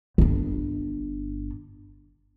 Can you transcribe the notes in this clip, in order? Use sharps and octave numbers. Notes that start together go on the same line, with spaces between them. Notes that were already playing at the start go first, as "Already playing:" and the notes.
G1 D4